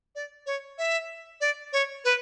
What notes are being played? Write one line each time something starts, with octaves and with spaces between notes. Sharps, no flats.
D5
C#5
E5
D5
C#5
B4